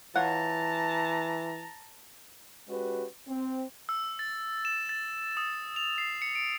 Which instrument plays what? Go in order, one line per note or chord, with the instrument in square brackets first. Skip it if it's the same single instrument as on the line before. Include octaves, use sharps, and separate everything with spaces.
[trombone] E3 [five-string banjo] F4 C#5 F#5 [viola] A5 A#5
[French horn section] G#3 C#4 F#4 G4 B4
C4
[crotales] E6
A6
E7
A6
D#6
F7
C7
C#7
D7